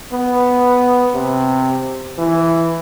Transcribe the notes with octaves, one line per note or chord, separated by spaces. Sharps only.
B3
C3
E3